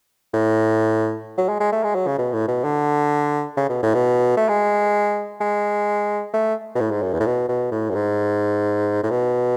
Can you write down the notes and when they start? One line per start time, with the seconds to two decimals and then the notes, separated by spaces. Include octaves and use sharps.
0.34 A2
1.38 F#3
1.49 G#3
1.60 G#3
1.72 A3
1.83 G#3
1.95 F#3
2.07 C#3
2.18 B2
2.33 A2
2.48 B2
2.64 D3
3.57 C#3
3.69 B2
3.83 A2
3.94 B2
4.37 A3
4.49 G#3
5.41 G#3
6.34 A3
6.75 B2
6.80 A2
6.91 G#2
7.02 F#2
7.14 E2
7.20 A2
7.26 B2
7.48 B2
7.71 A2
7.90 F#2
7.95 G#2
9.03 A2
9.10 B2